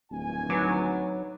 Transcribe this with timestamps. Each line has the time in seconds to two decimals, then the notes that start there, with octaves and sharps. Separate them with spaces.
0.11 D1 G#1 G2 G#5
0.50 F#3 D#4 B4 D6